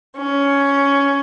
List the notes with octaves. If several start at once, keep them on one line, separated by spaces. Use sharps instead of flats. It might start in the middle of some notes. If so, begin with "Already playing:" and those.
C#4